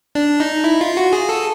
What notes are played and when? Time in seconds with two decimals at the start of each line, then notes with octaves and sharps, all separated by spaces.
0.15 D4
0.40 D#4
0.64 E4
0.81 F4
0.97 F#4
1.13 G#4
1.29 A4